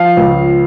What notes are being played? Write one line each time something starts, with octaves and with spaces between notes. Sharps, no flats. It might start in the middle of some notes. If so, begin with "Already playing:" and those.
Already playing: F3 F5
C#2